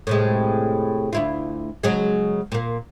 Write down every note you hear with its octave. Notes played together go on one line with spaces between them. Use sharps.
A2 C3 G#3
D2 E4 F4
C#3 F#3 G#3
A#2 A#3